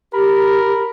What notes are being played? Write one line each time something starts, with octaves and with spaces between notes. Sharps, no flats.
G4 A#4 B5